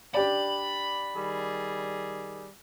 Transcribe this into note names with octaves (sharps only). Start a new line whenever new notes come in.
D4 G4 D5 B5
D#3 G3 G#4